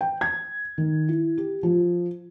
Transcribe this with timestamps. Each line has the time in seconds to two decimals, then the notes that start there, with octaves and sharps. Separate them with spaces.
0.01 G5
0.21 G#6
0.78 D#3
1.09 E4
1.38 G4
1.63 F3